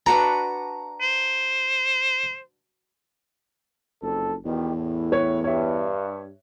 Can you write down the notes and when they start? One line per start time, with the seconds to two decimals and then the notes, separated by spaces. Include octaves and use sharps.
0.06 D4 F#4 B4 A#5
1.01 C5
4.03 F#1 F2 A4
4.45 E2 B2 D#3 G4
4.74 A2
5.12 B4 C#5
5.44 G2 C#5 E5